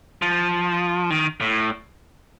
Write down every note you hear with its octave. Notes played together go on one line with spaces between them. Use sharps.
F3
D#3
A2